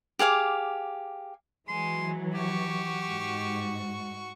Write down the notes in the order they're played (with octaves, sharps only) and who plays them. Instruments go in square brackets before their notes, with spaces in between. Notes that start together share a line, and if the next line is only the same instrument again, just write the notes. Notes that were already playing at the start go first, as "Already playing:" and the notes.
[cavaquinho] G4 G#4 F5 D6
[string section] E3 F#3 [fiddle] G#3 [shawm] C6
[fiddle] F#4 C#6 [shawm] G4
[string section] G#2